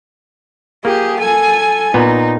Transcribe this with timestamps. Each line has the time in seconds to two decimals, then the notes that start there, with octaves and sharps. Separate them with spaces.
0.85 A#3 G4 G#4
1.20 A4 G#5
1.94 A#2 B3 D#4